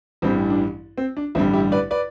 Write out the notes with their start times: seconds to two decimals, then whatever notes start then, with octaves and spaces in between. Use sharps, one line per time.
0.22 A1 G2 E3 G3 C4
0.50 D4
0.98 C4
1.17 D4
1.35 A1 G2 D3 G3 C4 E4
1.54 E4 G4
1.72 B4 D5
1.91 B4 D5